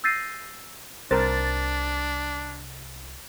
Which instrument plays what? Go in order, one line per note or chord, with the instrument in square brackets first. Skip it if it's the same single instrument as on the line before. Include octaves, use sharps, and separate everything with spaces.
[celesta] E6 G6 A6 A#6 C7 D#7
[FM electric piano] C2 A6 [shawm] D4 [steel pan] A#4 C5